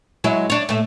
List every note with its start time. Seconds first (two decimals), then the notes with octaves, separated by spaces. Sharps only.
0.24 F#3 G#3 E4
0.50 D4 C#5
0.69 A2 A3